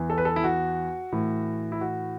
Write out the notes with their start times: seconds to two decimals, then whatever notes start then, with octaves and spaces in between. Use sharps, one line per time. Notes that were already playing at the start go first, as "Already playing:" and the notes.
Already playing: E2 E3
0.10 A4
0.18 B4
0.25 A4
0.36 E4
0.44 F#4
1.12 A2 E3
1.72 E4
1.81 F#4